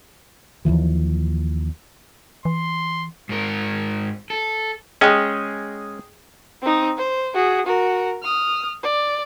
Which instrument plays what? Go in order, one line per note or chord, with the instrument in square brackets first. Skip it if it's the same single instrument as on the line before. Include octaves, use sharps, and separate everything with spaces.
[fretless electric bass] D#2 C#3 E3 F3
[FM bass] E3 [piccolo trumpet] C6
[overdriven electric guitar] G#2 A#4
A4
[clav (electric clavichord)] G#3 C#4 [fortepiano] G#4 D#5 G5
[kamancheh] C4 D#4
C5
F#4 G#4
F#4 A#4
D#6 F6
D5